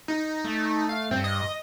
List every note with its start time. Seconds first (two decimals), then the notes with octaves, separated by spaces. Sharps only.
0.08 D#4
0.45 A3
0.89 F5
1.11 G2 C4
1.24 D#5